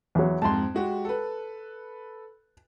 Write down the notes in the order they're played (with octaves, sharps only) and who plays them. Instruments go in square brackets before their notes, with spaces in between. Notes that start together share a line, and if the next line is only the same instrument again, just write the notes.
[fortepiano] E2 F#3
[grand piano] F2 G#2 [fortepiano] A5 C6
[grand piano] G#3 F#4 G4
A4 B4